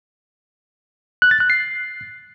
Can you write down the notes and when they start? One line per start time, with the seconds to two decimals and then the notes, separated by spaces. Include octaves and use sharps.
1.22 F#6
1.31 A6
1.40 F#6
1.50 C7